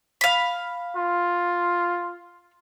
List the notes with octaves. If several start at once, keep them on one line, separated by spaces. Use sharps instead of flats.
F5 B5
F4